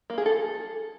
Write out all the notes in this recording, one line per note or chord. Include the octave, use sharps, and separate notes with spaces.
A#3
G#4
A4